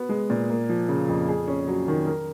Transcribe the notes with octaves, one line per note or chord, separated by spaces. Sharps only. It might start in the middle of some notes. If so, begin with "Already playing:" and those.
Already playing: B3 F#4
G#3
A#2
A#3
F3
C#3
F2
G#4
C#4
F#3
D#3
A#4